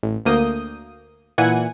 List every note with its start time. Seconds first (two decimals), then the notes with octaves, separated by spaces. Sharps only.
0.03 A1
0.25 D2 A#3 D#6 G6
1.38 A#2 E3 F#5 G#5